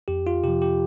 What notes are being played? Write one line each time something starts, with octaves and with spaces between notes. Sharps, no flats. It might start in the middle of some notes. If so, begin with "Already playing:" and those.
F2 G4
F4
C3 F3 G4
G4